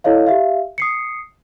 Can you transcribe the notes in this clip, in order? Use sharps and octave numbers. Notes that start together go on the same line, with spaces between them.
E4 A4 C#5 D#5 F5
G4 E5 F5
D#6 C7 C#7